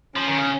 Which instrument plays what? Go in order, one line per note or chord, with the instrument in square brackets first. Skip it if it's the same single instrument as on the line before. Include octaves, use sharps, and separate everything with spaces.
[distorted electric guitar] F3 [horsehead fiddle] C#4
[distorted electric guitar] D#3
C#3